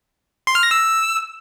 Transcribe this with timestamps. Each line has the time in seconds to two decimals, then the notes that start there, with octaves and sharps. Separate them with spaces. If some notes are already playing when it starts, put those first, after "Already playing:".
0.47 C6
0.55 F6
0.63 A#6
0.71 E6